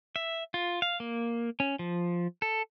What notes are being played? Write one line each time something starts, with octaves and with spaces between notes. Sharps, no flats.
E5
F4
F5
A#3
C#4
F3
A4